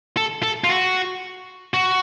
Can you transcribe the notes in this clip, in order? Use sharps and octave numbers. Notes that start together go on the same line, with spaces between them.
A4
A4
F4
F#4
F#4